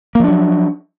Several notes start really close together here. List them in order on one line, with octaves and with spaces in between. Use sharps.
A#3 F3 D4 F#3